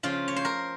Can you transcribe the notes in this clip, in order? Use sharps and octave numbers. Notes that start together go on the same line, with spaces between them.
C#3 F3 F4
C#5
C5
A#4